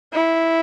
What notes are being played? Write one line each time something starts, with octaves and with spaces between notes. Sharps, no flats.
E4